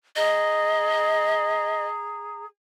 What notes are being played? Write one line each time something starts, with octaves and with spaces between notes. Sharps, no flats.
G#4 D#5 A#5